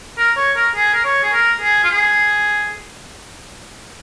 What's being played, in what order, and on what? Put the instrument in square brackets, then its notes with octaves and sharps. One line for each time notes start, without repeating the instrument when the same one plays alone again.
[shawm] A#4
C#5
A#4
G#4
A#4
C#5
G#4
A#4
G#4
F4
G#4